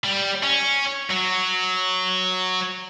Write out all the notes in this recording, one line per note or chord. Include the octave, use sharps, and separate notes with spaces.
G3
C#4
F#3